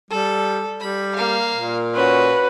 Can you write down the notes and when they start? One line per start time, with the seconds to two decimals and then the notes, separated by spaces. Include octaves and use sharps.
0.11 G3 A4
0.80 G3 B5
1.16 A#3 F5
1.55 A#2
1.95 C#4 F#4 B4